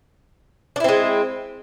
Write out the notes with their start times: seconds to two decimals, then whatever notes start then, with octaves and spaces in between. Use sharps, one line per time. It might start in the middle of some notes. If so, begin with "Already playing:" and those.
0.76 D4
0.80 E4
0.84 C4
0.88 G#3